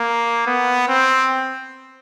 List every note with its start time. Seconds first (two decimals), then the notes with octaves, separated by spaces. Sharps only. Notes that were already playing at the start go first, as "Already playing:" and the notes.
Already playing: A#3
0.46 B3
0.88 C4